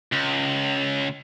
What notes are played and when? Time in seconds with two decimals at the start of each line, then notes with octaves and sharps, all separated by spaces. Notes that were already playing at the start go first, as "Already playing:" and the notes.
0.12 C#2